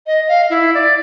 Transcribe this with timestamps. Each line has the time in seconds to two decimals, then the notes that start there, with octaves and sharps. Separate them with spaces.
0.07 D#5
0.28 F5
0.50 E4
0.74 D5